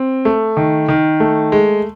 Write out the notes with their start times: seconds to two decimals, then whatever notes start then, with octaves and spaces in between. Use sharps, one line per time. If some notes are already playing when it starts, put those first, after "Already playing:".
Already playing: C4
0.25 A3
0.57 D#3
0.88 D#3
1.20 A3
1.52 G#3